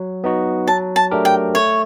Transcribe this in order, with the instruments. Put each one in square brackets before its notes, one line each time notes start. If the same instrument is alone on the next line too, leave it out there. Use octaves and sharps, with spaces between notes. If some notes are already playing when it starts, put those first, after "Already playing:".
Already playing: [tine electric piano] F#3
B3 D#4 F#4
[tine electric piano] F#3 [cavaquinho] A5
[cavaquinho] A5
[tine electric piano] A3 D4 G4 A#4
[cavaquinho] G5
[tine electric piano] A3 [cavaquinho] C#5